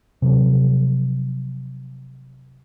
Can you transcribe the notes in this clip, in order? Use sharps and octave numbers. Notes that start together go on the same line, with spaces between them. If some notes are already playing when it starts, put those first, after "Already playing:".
C3 F3 F#3